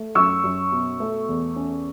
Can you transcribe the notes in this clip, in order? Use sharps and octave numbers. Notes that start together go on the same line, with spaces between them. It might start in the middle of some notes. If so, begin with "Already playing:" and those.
Already playing: A3
F#2 C#6 E6
F#2
B2
A3
E2
C#4